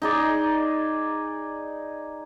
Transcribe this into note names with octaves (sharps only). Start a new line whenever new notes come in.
D#4 G#4 D5